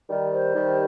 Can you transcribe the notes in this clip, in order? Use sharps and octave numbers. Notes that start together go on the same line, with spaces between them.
D#3 G3
C5
D#3 G3